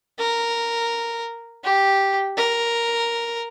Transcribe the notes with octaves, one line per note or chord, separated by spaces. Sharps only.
A#4
G4
A#4